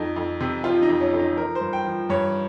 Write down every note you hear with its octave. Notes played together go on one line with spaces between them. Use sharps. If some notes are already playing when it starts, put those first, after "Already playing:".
Already playing: F2 D#4
F2
C3
F3 F4
D#4
F2
C#4
F2
D#4
F3 A#4
C5
G2
G5
F3
G2 C#5